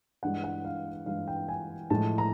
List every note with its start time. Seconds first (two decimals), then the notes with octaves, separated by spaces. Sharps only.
0.23 G2 E3 G#3 F#5
0.44 F#5
0.65 F5
1.06 G2 E3 G#3 F5
1.27 G5
1.49 G#5
1.90 A2 F3 G#3 A5
2.18 A#5